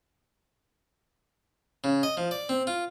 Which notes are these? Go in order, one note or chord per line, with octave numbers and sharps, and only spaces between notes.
C#3
D#5
F3
D5
C4
F4